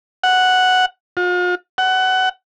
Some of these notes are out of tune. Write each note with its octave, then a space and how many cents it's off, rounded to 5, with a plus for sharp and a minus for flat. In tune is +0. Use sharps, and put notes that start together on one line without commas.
F#5 +0
F4 +45
F#5 +20